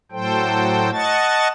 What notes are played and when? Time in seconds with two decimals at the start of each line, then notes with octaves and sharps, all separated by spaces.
0.12 A2 F#3 A4 C5 G5
0.93 D#5 F#5 A5 C#6 A6